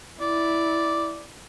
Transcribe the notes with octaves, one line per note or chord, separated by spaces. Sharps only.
E4 D5